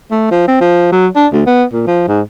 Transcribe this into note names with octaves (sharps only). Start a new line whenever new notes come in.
A3
F3
C4
F3
F#3
D4
D2
B3
A#2
F3
G#2